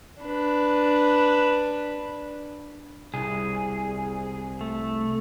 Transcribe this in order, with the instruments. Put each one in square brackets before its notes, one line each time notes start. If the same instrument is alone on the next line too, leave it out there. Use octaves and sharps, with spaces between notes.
[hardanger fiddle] D4 B4
[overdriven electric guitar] C2 [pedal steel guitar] G#4
[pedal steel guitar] A3